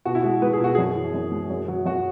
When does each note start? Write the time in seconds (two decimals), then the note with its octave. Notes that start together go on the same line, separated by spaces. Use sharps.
0.05 B2 F#4
0.15 E4
0.23 G#3 F#4
0.42 G#3 B4
0.53 G#4
0.60 B2 F#4
0.75 F#2 G#4
0.95 E3
1.14 F#2
1.32 G#3
1.50 F#2
1.68 F#3
1.86 F#2 F#4